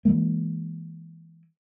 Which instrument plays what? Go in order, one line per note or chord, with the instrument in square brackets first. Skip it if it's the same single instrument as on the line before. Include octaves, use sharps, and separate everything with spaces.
[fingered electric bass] E3 F3 G#3 A#3